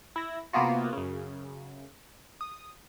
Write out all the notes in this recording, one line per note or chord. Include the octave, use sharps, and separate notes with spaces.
E4 A#6
C3 A#3 B3 F4 F#4
F#2 C#3
D#6